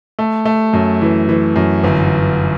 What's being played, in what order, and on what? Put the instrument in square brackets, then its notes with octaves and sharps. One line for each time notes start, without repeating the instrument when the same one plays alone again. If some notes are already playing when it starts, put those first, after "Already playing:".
[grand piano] A3
A3
F#2
E3
E3
F#2
G1